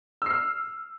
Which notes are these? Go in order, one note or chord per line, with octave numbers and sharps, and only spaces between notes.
E6 F6 C7